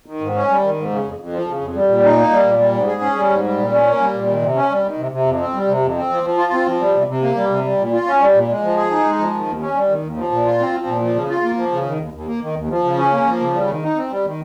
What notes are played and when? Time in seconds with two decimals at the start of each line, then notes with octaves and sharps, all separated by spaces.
0.06 D#3
0.21 G#2
0.35 C#4
0.49 G3
0.62 D#3
0.76 G#2
0.91 C#3
1.04 F2
1.18 F2
1.33 F3
1.47 C#3
1.61 F2
1.75 G3
1.88 A#2
2.03 D#4
2.16 A#3
2.31 G3
2.44 A#2
2.59 G3
2.73 G#2
2.87 G#4
3.01 C#4
3.15 G3
3.29 G#2
3.44 G3
3.58 A#2
3.71 C#4
3.86 A#3
4.00 G3
4.13 A#2
4.27 D#3
4.42 C3
4.55 C#4
4.70 G3
4.84 D#3
4.97 C3
5.11 C3
5.26 F2
5.40 C4
5.53 G3
5.68 C3
5.82 F2
5.96 C4
6.10 F3
6.23 F3
6.37 F4
6.53 C4
6.67 F3
6.80 G3
6.94 C3
7.08 C3
7.22 A#3
7.36 G3
7.50 C3
7.64 G3
7.78 A#2
7.93 F4
8.07 C#4
8.20 G3
8.34 A#2
8.49 G#3
8.62 F3
8.77 G#4
8.91 D#4
9.05 G#3
9.19 F3
9.33 D#3
9.47 D#2
9.60 C#4
9.75 G3
9.89 D#3
10.02 D#2
10.16 F3
10.31 A#2
10.45 F4
10.60 C4
10.73 F3
10.87 A#2
11.01 F3
11.14 C#3
11.29 F4
11.43 A#3
11.57 F3
11.72 C#3
11.86 D#3
12.00 D#2
12.14 D#2
12.27 A#3
12.42 D#3
12.56 D#2
12.69 F3
12.84 C#3
12.98 C#4
13.11 A#3
13.26 F3
13.40 C#3
13.54 G3
13.68 D#3
13.82 D#4
13.96 C4
14.09 G3
14.24 D#3